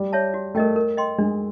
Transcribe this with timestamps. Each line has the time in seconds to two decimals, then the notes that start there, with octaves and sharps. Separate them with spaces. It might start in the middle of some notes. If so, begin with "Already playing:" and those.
Already playing: G3
0.13 C#5 E5 A5
0.34 F#4
0.55 A3 A#4 D#5 G5
0.76 A#4
0.97 D#5 G5 C6
1.18 G#3 D4